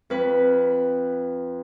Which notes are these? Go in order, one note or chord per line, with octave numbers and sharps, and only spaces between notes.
F2 B4